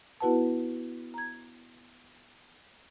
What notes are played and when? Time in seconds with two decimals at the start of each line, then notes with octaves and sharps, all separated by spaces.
0.20 B3 E4 F#4 B4 F#5 A5
1.14 A#5 G#6